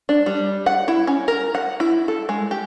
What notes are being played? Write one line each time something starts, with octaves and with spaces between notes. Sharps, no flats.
D4
G3
F#5
E4
C#4
A#4
F#5
E4
A4
G#3
G4